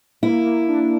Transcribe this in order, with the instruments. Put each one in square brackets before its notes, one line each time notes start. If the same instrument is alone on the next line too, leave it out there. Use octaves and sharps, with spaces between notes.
[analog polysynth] A#3 [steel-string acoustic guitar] E4
[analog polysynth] A#3
D4